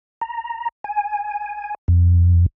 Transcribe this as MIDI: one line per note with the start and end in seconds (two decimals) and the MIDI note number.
0.21 0.69 82
0.84 1.75 80
1.88 2.46 41